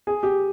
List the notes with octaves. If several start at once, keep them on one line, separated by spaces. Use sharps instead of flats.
G#4
G4